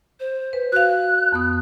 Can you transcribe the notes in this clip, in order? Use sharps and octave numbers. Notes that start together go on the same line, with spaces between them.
C5
B4
F#4 F5 F#6
F2 B3 D#6